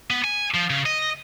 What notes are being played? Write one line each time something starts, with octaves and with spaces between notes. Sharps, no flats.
B3
G#5
F3
C#3
D#5